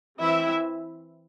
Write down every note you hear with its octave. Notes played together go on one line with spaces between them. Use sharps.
E3 C4 E4 E5